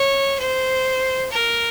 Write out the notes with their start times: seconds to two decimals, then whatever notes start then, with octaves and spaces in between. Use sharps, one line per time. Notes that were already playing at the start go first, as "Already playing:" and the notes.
Already playing: C#5
0.40 C5
1.31 A#4